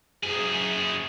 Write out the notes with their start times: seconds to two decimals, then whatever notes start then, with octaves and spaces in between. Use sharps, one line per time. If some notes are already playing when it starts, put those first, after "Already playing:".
0.23 F#2 G#4